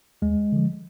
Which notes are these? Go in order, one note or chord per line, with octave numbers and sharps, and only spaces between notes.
D#2 G#3
D3 F3